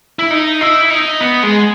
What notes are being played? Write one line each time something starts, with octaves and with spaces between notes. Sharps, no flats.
E4
D#4
E4
D#4
B3
G#3